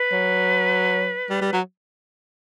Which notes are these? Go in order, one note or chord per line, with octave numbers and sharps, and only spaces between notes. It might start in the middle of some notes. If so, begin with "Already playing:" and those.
Already playing: B4
F#3
G3
G3
F#3